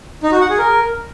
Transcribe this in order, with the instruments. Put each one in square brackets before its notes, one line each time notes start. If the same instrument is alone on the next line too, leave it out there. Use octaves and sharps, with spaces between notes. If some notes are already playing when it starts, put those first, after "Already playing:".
[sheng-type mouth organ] D#4
F#4
F#5
G#4
A#4